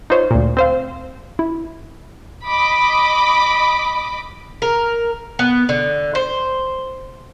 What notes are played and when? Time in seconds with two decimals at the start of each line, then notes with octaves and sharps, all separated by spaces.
0.10 D#4 F4 C5 C#5
0.31 D2 A#2
0.57 C4 C5 F5
1.39 E4
2.48 D#5 B5 D6
4.62 A#4
5.39 B3
5.69 D3
6.15 C5